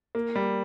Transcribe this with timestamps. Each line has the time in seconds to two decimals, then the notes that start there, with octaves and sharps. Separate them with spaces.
0.15 A#3
0.36 G3